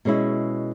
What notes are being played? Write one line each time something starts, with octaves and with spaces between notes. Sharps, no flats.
B2 G#3 C#4 E4